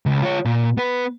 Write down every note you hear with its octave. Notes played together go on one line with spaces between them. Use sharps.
C#2
F4 C#5
A#2
B3 B4